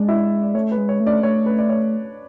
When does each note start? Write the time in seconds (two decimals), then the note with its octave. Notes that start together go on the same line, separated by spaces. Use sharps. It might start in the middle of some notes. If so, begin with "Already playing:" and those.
Already playing: G#3 D4 D5
0.08 E4 E5
0.43 D5
0.54 A3 C#5
0.72 B4
0.77 G#3
0.89 C#5
1.00 A3
1.06 D4 D5
1.23 A3 C#5
1.46 B4
1.59 D5
1.70 C#5